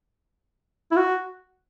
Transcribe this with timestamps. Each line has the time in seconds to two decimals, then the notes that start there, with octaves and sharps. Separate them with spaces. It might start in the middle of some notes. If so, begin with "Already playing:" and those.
0.91 E4
0.97 F#4